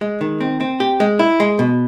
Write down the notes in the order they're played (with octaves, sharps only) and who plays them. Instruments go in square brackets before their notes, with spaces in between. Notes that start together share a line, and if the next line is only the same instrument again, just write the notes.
[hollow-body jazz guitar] G#3
D#3
C4
C4
G4
G#3
E4
G#3
B2